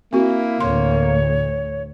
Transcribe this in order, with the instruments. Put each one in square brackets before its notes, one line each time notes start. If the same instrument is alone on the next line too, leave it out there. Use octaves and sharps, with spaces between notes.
[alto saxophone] A#3 [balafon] C4 F#4 [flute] E4
[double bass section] D2 A2 [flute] C#5 [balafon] C6